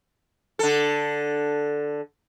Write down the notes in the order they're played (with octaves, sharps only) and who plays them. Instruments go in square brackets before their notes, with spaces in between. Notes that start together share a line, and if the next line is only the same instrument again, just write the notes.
[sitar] D3 A4